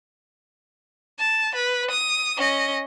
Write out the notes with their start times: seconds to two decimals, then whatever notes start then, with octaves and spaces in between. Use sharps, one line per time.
1.19 A5
1.55 B4
1.91 D#6
2.37 C#4 D#5